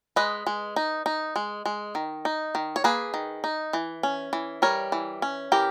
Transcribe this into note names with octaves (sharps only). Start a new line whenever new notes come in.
G#3 B4 D#5
G#3
D#4
D#4
G#3
G#3
D#3
D#4
D#3
C#5
A#3 G#4 B4
D#3
D#4
E3
C#4
E3
G3 A#4 C#5
E3
C#4
E3 G4 A#4